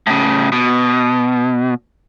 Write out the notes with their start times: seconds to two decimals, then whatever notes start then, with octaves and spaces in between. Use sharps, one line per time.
0.07 A2 C#3
0.52 B2